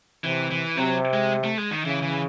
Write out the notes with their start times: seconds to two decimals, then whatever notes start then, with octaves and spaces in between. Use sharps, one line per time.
0.24 C3 E3
0.51 E3
0.77 C3 F#3
1.14 G#3
1.44 A3
1.58 G#3
1.71 D#3
1.85 C#3 E3
2.03 E3